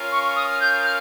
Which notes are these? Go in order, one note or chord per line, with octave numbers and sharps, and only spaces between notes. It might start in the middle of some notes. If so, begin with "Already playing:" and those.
Already playing: C#4 F4 A#4 F5
C#6
D#6
F6
G6
F6